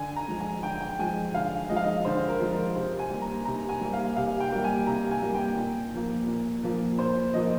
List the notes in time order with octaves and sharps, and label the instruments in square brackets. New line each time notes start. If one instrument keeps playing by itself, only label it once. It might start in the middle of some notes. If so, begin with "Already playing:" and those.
Already playing: [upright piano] D3 G#5
A#5
F3 G#3
G#5
D3 G5
G5
F3 G#3 G#5
D3 F5
F3 G#3 D#5
F5
D#5
D3 C5
A#4
F3 G#3
A#4
C3 C5
G#5
G3 A#3
A#5
C3 A#5
G#5
G3 A#3
F5
C3 F5
G5
G3 A#3
G#5
C3 A#5
G#5
G3 A#3
G5
A#2
F3 A#3
A#2
F3 A#3
A#2 C5
F3 A#3 D#5